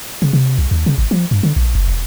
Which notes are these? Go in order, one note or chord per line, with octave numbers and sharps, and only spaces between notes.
C#3
C3
C2
D#2
C#3
G#1
F3
G2
D3
A#1
F#1
E1